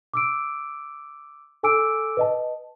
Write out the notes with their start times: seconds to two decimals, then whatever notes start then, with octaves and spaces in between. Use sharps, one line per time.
0.14 D6 E6 D7
1.63 A4 G#5 D6 E6 D7
2.17 B4 D#5 A5